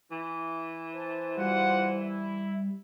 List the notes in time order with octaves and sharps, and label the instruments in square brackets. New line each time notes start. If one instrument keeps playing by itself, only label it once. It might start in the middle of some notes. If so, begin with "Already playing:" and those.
[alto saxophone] E3 [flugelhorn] E4
[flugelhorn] C5 [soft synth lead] A5
[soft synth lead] G3 [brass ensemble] F4 F#4 F#5
[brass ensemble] E4